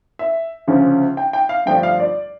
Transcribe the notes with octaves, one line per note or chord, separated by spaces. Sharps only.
E5
D2 C#3 F3 C#4
G5
G5
F5
G2 D3 F3 A3 D4 G5
F5
D5